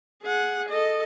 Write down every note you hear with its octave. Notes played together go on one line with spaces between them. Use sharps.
G#4 F#5
A4 D#5